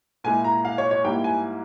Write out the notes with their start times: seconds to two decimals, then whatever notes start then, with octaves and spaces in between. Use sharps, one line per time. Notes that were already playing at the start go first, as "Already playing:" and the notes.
0.24 A#2 G#3 E4 G#5
0.44 A#5
0.65 F5
0.78 C#5
0.91 C#5
1.04 G#2 G3 A#3 E4 G5
1.24 G#5